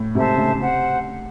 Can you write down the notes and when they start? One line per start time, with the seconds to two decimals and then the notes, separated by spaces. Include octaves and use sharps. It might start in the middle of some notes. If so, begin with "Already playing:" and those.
Already playing: A2
0.15 G#2 C3 A4 C5 E5 A5
0.37 A2 C#3
0.60 C3 C5 F#5